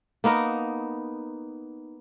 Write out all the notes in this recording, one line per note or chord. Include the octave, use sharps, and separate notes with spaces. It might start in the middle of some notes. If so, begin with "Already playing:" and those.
A#3 B3 D#4 A#4